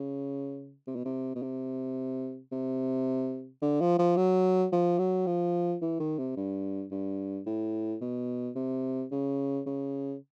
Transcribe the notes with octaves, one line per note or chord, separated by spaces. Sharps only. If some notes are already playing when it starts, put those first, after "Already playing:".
Already playing: C#3
C3
B2
C3
B2
C3
C3
D3
F3
F3
F#3
F3
F#3
F3
E3
D#3
C3
G2
G2
A2
B2
C3
C#3
C#3